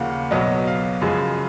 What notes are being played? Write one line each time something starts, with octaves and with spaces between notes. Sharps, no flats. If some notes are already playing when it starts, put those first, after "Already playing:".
Already playing: D#2 C#3 F3 A#3 F5 F#5
B1 B2 F#3 B3 D#5
F5
F#2 C#3 F3 G#3